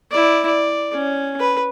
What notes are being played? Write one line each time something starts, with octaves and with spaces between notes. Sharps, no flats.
E4 D5
D5
C#4
B4